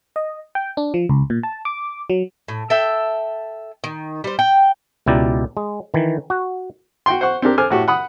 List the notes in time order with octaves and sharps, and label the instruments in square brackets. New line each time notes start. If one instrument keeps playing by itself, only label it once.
[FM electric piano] D#5
G5
D4
F3
C#2
A#2
A5
D6
F#3
[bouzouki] A2
A4 E5 G5
D#3
G3 C5
G5
[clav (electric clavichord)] C#2 B2 E4 G4 D5 A#5
G#3
D#3 E3
F#4
[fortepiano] F#4 G5 C6
C5 F#5 C#6
C4 D4 G4 A#4
A4 C5 G#5 D6 F6
A2 F#4 G4
F#5 B5 D#6